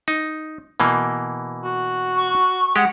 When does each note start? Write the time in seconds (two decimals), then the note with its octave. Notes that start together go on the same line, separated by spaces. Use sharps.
0.08 D#4
0.80 B2 E3 A#3
1.64 F#4
2.16 C#6
2.76 G#3 G4 F#5